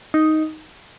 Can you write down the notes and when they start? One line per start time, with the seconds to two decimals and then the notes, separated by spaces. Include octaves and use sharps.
0.14 D#4